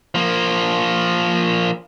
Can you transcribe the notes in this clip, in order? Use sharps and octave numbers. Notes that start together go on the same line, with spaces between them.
F3 A#3